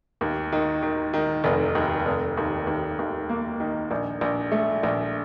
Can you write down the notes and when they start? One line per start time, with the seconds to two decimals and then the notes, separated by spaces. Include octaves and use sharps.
0.21 D#2
0.53 D#3
0.83 D#3
1.14 D#3
1.44 F1
1.75 D#2
2.05 F1
2.37 D#2
2.67 D#2
2.99 D#2
3.29 A#3
3.60 D#3
3.91 A#1
4.21 A#1
4.52 A3
4.83 A#1